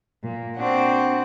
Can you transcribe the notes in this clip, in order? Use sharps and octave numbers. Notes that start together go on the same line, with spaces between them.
A#2
C4 D4 F#4